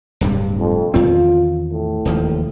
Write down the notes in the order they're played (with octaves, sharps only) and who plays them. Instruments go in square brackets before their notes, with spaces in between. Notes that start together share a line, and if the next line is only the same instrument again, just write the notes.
[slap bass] D1 G2 C3
[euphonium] F2
[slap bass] E2 D#3 C4 [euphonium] F4
[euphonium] A2
[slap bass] E1 D#2 F3